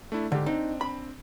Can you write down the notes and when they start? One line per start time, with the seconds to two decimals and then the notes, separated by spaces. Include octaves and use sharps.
0.12 A3 D4 E4
0.32 G#2 D3 G4
0.46 C4 D4 D#4
0.81 B5